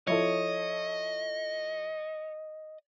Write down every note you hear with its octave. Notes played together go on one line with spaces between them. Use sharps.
F3 E4 A4 C#5 D#5